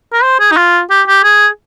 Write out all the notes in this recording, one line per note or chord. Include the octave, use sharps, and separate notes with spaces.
A#4
C5
G#4
D#4
F4
G4
G4
G#4